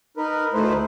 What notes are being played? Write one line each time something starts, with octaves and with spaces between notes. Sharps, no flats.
D#4 A#4 B4
D2 A3 D#4 E4 B4 C5